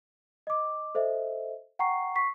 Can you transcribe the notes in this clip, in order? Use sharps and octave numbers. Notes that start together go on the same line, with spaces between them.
D#5 D6
A4 C5 D#5 E5
F#5 G5 A#5 C#6 C7
C#6 B6 C7